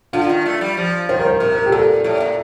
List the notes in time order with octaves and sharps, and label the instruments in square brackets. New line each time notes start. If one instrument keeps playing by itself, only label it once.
[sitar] D3 [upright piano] F4
[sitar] D#3
A3
G3
F3
[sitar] D#3 [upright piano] C5
[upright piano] A#4
C5
[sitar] C3 [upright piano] A#4
[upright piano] A#4
G4
[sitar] A#2 [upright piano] A4
[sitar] A2
A#2